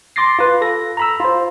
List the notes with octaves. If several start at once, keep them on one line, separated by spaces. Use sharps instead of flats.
C6 D6 A6 A#6 C7
F4 B4
A4 A#6
A#5 B5 E6
F4 C5